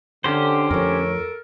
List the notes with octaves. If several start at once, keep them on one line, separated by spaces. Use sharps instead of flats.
D3 C#4 G4 C5
F2 D3 F3 A3 A4 A#4 C#5